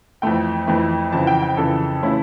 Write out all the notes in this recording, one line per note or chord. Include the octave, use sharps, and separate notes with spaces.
F2 E3 A3 G5
F2 E3 A3
F2 C#3 E3 A5
G5
G5
F2 C#3 E3 A4
C#3 E3 A3 C#4 E4